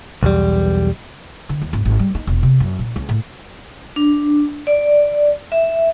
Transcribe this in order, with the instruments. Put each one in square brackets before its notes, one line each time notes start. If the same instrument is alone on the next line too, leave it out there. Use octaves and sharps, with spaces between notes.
[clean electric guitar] B1 E2 G3
[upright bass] D3
D#2
G#1
G#1
G3
D#4
E1
C3
F#2
A#2
C#2
A2
[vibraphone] D4
D5
E5